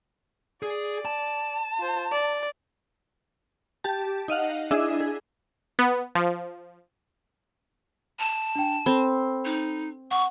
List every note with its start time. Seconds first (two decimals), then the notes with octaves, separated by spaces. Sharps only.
0.62 G#4 D5
1.05 A5
1.79 F4 C5
2.11 D5
3.84 G4 A5
4.28 D#4 D#5 F5 F#5
4.71 D4 E4 G#4 D#5 E5
5.00 G#4
5.79 B3
6.15 F3
8.19 A5
8.56 D4 G5
8.86 C4 A4 B5
9.45 D#4
10.11 F#5 C#6